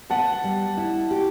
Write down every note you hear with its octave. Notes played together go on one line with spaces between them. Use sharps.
B3 F#5 A5
G3
E4
G4